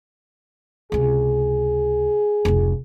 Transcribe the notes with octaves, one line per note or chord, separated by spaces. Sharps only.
C#2 C3 G#4
F1 C#2